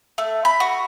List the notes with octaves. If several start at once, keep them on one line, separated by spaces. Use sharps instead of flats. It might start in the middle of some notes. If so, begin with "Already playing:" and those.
A3
B5
F#4